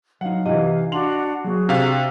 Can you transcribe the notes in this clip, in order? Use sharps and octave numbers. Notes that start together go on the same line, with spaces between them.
F#3 D#4 F5 F#5
C3 E3 D#5
D4 F#4 F#5 C6 F7 F#7
F#3 A#3 F#4 G#4
C3 D4 F5